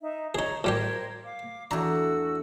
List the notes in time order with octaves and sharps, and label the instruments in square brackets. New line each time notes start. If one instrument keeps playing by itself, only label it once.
[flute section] D#4 E5
[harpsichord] D#4 G#4 [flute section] C#5 A#5
[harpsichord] A2 G3 G4 [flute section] A#4 C5 G#6
[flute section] F5 D6
[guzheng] E2 A3 D4 [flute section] F#4 E6 [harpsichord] A#5